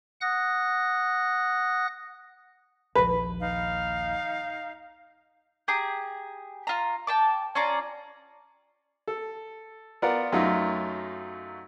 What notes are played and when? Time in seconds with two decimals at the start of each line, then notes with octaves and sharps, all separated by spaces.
0.21 F#5 D#6 F#6 A#6
2.95 A#1 D#2 B4
3.39 D#4 F5
5.68 G4 G#4 A#5
6.67 F4 A#5
7.07 G5 A5 D6
7.55 C#4 F4 D5 A#5
9.08 A4
10.02 B3 F4 A#4 D5 F#5
10.32 F#2 F#3 A3 D#4 F4